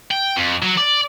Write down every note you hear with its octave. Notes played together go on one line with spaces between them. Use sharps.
G5
F2
F#3
D5